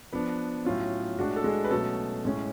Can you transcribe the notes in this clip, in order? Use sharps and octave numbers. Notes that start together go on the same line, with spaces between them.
F3 B3 D4 B4
A2 F#3 C#4 F4
A2 G#3 D4 F#4
A4
G#3 G#4
B4
B2 F#3 A3 C#4 A4
A2 G#3 C#4